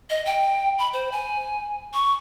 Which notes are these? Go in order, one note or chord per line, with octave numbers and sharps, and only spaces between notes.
D#5
G5
B5
C5
G#5
C#6